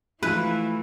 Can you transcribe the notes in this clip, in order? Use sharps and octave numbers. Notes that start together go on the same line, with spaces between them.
E3 F3 A3 E4 F4 B4